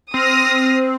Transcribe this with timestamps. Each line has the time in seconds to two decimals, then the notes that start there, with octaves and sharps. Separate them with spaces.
0.14 C4 D#6 F6 A#6